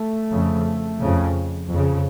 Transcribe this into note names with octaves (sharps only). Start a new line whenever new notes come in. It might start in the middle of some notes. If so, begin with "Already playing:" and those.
Already playing: A3
F2 C#3
F2 C#3
F2 C#3